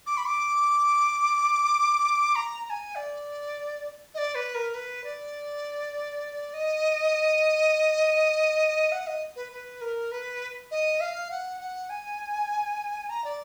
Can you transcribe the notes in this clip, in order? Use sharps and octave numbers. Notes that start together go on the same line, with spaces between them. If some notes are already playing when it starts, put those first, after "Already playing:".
D6
B5
D6
A#5
A#5
G#5
D5
D#5
D5
B4
A#4
B4
D5
D#5
F#5
D#5
B4
B4
A#4
B4
D#5
F5
F#5
F#5
G#5
A#5
D5